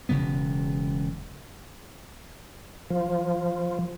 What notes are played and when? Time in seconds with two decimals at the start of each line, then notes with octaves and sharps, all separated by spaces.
0.09 E1 C#3 F#3 B3
2.90 F3